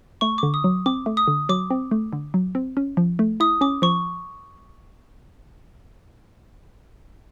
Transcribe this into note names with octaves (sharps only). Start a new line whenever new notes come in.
A3 C#6
D3 D6
D#6
F#3
C4 D6
A3
D#6
D3
F#3 D6
C4
A3
D3
F#3
C4
C#4
F3
A3
E4 D#6
C#4 D6
F3 C#6